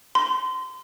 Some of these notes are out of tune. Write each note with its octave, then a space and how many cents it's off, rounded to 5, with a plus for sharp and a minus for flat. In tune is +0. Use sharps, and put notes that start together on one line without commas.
C6 -25